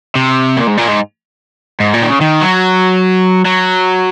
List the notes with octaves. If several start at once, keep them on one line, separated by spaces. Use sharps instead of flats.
C3
A#2
G#2
A#2
G#2
G#2
A#2
D#3
C#3
D#3
F#3
F#3